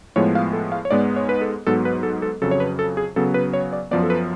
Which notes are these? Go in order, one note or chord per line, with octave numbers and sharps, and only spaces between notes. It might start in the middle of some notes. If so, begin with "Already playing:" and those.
A2 F3 G#3 B3 C#5
F5
A4
F5
C#5
G#2 G#3 B3 D5
C#5
B4
A4
G#2 F#3 B3 A4
B4
A4
A4
F2 C#3 F#3 A4
C#5
B4
A4
G#4
C#3 F#3 B3 A4
B4
C#5
D5
F#2 F3 B3 D5
A4
B4